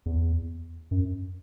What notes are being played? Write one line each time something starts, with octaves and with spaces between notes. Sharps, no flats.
E2
F#2